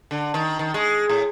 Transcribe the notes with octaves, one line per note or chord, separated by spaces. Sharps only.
D3
D#3
D#3
G#3
A2